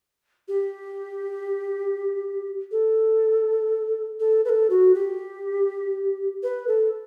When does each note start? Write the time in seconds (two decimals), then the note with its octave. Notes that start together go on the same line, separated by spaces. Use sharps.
0.48 G4
2.72 A4
4.20 A4
4.45 B4
4.49 A4
4.70 F#4
4.94 G4
6.43 B4
6.68 A4